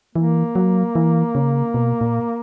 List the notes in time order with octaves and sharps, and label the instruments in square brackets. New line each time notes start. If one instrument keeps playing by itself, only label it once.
[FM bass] E3 [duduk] A#3
[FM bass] F#3
E3
C#3
B2
A#2